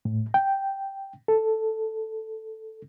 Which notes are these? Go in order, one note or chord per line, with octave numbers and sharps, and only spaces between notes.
A2
G5
A4